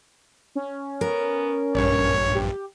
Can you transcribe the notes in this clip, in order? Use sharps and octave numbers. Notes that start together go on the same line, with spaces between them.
C#4
B3 A#4
A#1 G2 C#5
G4